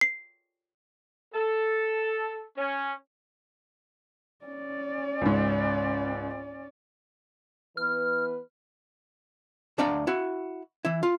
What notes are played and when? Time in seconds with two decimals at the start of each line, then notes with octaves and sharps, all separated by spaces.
0.01 C7
1.35 A4
2.58 C#4
4.45 C#4 D5
5.21 C#2 G#2
7.77 E3 B3 B4 F6
9.78 D2 D4 D5 F5 G5 A#5
10.07 E4 F#4
10.85 E3 E4
11.03 F4